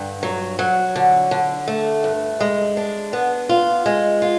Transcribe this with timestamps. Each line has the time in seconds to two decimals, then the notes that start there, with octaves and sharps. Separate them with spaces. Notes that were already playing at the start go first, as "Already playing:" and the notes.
Already playing: G2 D3
0.23 F#3
0.59 F#3
0.96 D3
1.31 D3
1.68 A3
2.04 G2
2.40 G#3
2.77 D4
3.13 B3
3.49 F4
3.86 G#3
4.22 F4